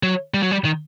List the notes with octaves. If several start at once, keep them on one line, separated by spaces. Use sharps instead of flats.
F#3
G3
F#3
G3
D#3